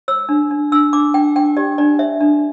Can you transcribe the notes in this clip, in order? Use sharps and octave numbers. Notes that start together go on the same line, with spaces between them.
C#5 E6
D4
D4
D4 E6
D4 D6
D4 G5
D4 G5
G4 D5
D4 D5
C#5 E5
D4